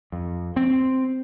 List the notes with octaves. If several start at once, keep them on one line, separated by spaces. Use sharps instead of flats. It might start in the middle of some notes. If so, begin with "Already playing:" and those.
F2
C4